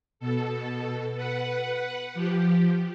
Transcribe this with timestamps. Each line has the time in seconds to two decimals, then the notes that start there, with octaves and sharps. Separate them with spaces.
0.20 B2 A4
1.15 B4 F#5
2.14 F3 G4